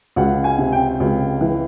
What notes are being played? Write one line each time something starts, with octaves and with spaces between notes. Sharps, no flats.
C#2 F#5
G#5
C3
G5
C#2
E3